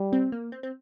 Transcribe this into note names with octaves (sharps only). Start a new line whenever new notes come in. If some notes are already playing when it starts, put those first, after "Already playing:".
Already playing: G3
C4
A#3
C4
C4